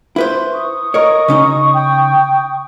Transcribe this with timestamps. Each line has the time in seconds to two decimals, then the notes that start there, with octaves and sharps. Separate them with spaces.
0.16 E4 B4 C5
0.52 C#6 D#6
0.94 A#4 C#5 D#5
1.28 C#3 C#4 D#4
1.74 G5